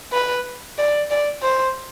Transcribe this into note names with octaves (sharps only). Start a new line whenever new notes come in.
B4
D5
D5
C5